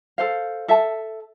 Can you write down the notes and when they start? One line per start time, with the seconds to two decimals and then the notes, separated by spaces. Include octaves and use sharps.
0.18 A4 C5 F5
0.68 A4 E5 A5